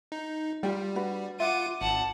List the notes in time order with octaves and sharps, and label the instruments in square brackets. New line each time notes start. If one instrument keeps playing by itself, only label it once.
[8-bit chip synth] D#4
[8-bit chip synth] G3 [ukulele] F4 G4 G5
[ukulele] D4 F#4 B4
[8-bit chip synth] F4 F#5 [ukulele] E5 [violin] D6 D#7
[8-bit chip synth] G#1 [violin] F#5 A5